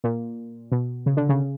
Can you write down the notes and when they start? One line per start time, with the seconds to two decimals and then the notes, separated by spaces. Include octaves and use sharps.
0.04 A#2
0.72 B2
1.06 C#3
1.17 D3
1.29 C#3